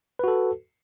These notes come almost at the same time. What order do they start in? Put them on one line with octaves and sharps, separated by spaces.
B4 F#4 A4